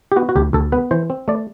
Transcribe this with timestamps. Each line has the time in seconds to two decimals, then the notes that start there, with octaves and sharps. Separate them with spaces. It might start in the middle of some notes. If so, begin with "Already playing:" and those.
0.12 G4
0.16 B3 F#4
0.29 F#4
0.36 D2 G4
0.53 D2 A4
0.72 B3 B4
0.91 E3 C5
1.10 C4
1.28 A3 D5